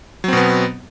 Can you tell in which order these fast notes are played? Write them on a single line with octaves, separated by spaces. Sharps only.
F#3 C4 B2 B3